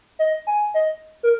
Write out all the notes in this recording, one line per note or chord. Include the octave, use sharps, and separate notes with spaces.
D#5
G#5
D#5
A#4